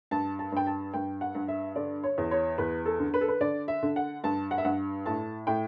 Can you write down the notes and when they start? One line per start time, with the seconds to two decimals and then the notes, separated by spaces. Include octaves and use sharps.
0.11 G2 A5
0.39 A5
0.52 G2 G5
0.67 A5
0.94 G2 G5
1.21 F#5
1.35 G2
1.48 E5
1.76 D3 D5
2.04 C#5
2.18 E2
2.31 C#5
2.58 E2 B4
2.86 A4
2.99 D3
3.14 B4
3.21 A4
3.28 B4
3.41 D3 D5
3.68 E5
3.83 D3
3.96 F#5
4.24 G2 A5
4.51 F#5
4.58 E5
4.65 G2 F#5
5.06 A2 A5
5.47 A2 G5